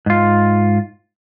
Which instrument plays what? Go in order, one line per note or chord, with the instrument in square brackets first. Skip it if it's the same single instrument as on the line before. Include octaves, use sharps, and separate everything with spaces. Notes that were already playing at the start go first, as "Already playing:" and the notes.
[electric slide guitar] G#2 F4